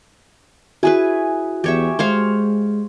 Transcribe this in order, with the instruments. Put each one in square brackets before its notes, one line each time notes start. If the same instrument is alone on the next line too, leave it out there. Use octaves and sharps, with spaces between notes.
[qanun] E4 G#4 B4 [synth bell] F#4 G#5
[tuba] E2 [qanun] G4 C#5 E5
[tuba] G#3 [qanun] C5 C#5 F5